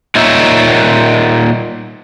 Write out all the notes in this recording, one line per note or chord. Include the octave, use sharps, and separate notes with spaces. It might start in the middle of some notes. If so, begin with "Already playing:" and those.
A#2 A#3 D#4 C#5 E5